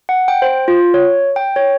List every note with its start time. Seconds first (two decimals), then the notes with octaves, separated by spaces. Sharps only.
0.09 F#5
0.28 G5
0.42 C5
0.68 F4
0.94 C#5
1.36 G5
1.56 C#5